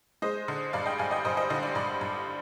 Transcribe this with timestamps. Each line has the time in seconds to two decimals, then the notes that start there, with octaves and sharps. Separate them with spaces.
0.22 G#3 C5 D#5
0.48 D3
0.73 G2 D5 F5
0.86 D#5 G5
0.98 G2 F5 G#5
1.11 D#5 G5
1.25 G2 C5 D#5
1.37 C5 D#5
1.50 D3 C5 D#5
1.63 D5
1.75 G2 D5
2.01 G2